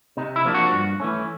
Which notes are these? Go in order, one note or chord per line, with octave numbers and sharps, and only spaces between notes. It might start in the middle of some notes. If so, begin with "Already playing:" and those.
C3 D#4
E4
F3 A#3 D4
F#4
G2
E3 A3 C#4